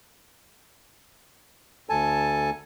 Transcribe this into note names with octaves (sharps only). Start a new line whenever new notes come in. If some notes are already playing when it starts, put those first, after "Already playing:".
D2 A4 G#5 A5